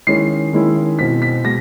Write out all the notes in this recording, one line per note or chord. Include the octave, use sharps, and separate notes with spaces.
D#3 G#3 C#4 E4 C7
D#3 G#3 C#4 E4
B2 G#3 C4 E4 B6
B6
B2 G#3 A#6